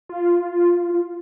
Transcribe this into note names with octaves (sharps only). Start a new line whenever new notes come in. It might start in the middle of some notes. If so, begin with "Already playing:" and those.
F4